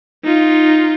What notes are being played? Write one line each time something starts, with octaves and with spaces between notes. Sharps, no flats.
D#4 F4